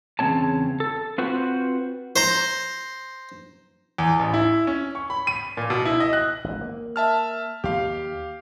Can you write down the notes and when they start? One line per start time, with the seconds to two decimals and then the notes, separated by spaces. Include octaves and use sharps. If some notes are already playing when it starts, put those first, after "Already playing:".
0.19 E2 C#3 G#3 C4 C#5 A5
0.80 A4
1.18 C4 F4 F#4 B4 C5
2.16 C5 A#5 C6
3.98 E2
4.19 A1
4.34 E4
4.67 C#4
4.95 C#6
5.10 B5
5.27 D#7
5.57 A#2
5.70 B2
5.85 E4
6.00 D#5
6.13 F#6
6.44 G#1
6.61 A#3
6.96 E5 A5 F6
7.64 D#2 G4 F5